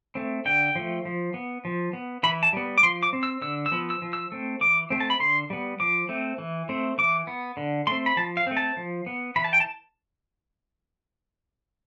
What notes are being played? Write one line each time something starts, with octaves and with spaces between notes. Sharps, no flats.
A3 C4
D3 G5
F3 A3
F3
B3
F3
B3
E3 B5
A5
G3 B3
D6
F3 C6
D6
C4
E6
D3 E6
E6
F3 B3
E6
F3
E6
A3 C4
E3 D6
A3 C4
A5
B5
D3 C6
G3 B3
F3 D6
A3 C4
E3
A3 C4
E3 D6
B3
D3
A3 C4 C6
B5
F3 A5
F5
A3 C4
A5
F3
B3
E3 B5
A5
G5
A5